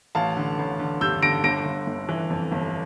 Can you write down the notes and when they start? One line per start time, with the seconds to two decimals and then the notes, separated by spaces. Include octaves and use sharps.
0.15 A1 F5 A5
0.37 D3
0.59 A1
0.79 D3
1.01 G2 E6 G6
1.22 D3 A#6 D7
1.44 G1 A#6 D7
1.66 G1
1.87 G1
2.09 E3
2.30 F2
2.52 G1